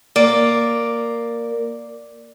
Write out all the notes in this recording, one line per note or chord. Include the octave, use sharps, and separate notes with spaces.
A#3 D5